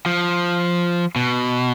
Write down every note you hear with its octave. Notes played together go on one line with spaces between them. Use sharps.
F3
B2